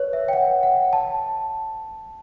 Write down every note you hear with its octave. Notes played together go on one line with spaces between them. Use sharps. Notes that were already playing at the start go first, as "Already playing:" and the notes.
Already playing: B4 C#5
E5
G5
F#5
F#5
A5